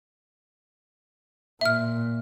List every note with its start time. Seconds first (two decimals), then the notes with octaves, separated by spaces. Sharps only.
1.61 A#2 E5 F6